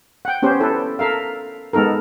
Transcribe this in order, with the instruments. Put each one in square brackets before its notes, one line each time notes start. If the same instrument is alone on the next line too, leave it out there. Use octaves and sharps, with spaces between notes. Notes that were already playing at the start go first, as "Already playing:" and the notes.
[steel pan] F#5 G5
B3 C#4 G4 C5
E4 A4 B4 C5
A4 A#4 E5 F5
G#3 B3 D#4 A4 A#4